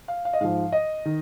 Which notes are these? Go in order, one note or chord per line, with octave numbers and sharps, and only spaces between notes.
F5
F5
D#5
G#2 F3 F5
D#5
D#3